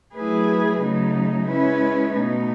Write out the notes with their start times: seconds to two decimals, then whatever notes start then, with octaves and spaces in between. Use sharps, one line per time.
0.13 F#3 A3 E4 G#4 B4
0.80 C#3 F#3 A3 D#4
1.47 G#3 C#4 E4 B4
2.13 B2 A3 D#4